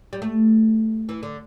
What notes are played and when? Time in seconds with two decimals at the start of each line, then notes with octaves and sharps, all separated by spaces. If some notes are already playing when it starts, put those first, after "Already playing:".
0.13 G3
0.22 A3
1.09 E3
1.23 D3